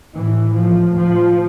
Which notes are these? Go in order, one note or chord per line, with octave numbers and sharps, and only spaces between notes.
A2 E3
F3
F3